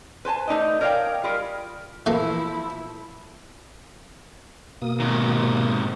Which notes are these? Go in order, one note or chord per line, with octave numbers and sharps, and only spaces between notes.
B4 C5 G#5 A5
A3 D#4 D5 D#5
A#4 C#5 D5 E5 F5 G5
G3 F4 G#4 A#4
E3 F3 A3 A#3 E4
B2 A#3 D#6
G#2 C3 D#3